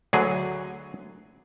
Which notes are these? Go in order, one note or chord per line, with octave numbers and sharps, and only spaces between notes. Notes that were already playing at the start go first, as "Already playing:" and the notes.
D2 D3 F#3 G#4